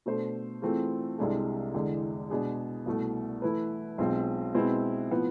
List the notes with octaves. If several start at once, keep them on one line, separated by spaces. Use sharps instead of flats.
B2 A3 D4 A4 C5
E3 A3 C4 F4 G#4
C2 C3 G#3 D4 A4
E2 D3 G#3
B2 G#3 D4 G#4
C2 B2 A3
E3 A3 E4 B4
B1 B2 G#3 C4 F4
B2 G#3 C4 E4 B4
A2 F3 B3